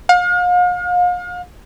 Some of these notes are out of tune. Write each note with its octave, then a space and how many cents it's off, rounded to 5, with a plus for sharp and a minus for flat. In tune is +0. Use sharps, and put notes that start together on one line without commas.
F5 +40